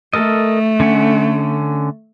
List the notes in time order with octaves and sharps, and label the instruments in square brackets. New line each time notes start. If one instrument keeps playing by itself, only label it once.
[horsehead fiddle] A3 [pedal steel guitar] A4 A#4 D#5
[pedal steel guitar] D3 C#4 F#5